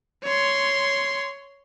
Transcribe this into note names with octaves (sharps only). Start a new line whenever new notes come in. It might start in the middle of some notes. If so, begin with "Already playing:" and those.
C#5 C6